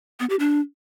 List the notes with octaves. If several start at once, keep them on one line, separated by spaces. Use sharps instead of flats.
B3
G4
D4